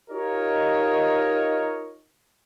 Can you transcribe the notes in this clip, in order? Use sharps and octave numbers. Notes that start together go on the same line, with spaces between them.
D#4 F4 G4 A#4 C#5 D#5